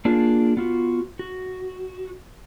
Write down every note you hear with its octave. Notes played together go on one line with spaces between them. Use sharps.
A#3 D4 F4 G#4 A#4
B3 F4 F#4
F#4